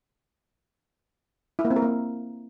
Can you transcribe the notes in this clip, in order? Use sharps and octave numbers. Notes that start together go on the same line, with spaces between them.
E4
A#3
C4
A#4
A#3